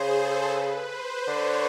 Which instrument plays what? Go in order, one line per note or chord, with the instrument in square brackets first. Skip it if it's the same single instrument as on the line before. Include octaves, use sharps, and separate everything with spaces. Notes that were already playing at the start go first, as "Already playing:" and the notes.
Already playing: [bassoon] C#3 [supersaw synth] G#4 C5
[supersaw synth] A4
B4
C5
[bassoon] D3 [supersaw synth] C#5